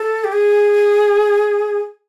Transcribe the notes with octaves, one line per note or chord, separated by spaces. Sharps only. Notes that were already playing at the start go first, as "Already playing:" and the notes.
Already playing: A4
G4
G#4